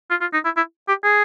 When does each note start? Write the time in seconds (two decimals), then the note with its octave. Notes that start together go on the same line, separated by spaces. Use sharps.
0.10 F4
0.21 F4
0.34 D#4
0.45 E4
0.57 E4
0.88 G4
1.04 G#4